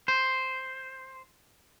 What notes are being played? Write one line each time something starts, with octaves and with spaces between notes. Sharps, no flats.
C5